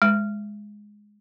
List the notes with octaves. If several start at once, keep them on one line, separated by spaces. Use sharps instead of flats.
G#3